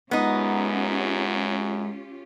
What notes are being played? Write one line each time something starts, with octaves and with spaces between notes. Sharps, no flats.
F#2 G#3 B3 C#4 D#4 F4 G4